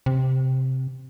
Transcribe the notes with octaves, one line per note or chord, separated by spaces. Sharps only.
C3